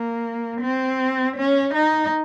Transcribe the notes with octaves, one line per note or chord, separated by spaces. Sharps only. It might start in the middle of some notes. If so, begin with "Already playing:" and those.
Already playing: A#3
C4
C#4
D#4